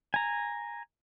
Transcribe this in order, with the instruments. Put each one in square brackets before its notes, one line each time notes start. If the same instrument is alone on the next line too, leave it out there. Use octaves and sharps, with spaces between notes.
[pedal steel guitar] G#5 A#5